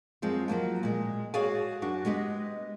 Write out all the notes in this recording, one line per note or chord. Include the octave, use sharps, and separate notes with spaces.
F#2 F3 G#3 C4
F3 F#3 A#3 F4
A#2 G#3
F#4 G#4 C#5 D5 F5 G#5
F#2 D4 F#4
G#3 B3 G4 D#5